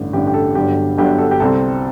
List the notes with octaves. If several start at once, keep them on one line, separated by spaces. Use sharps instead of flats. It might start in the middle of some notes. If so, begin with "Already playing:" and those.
Already playing: A1 G2 D3
A1 G2 D3 G4
G4
A4
G1 G2 D3 F#3 G4
G1 G2 D3 F#3 G4
A4
G4
C2 C3 G3 C4 A4